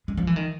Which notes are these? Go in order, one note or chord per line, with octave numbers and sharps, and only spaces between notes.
G#3
F3
E3
D#3